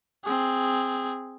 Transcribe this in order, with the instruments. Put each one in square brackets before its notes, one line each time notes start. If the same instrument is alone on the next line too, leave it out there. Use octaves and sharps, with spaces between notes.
[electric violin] C4 G#4